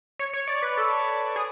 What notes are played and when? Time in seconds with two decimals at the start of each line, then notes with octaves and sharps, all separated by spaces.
0.19 C#5
0.33 C#5
0.48 D5
0.62 B4
0.77 A4
1.36 G#4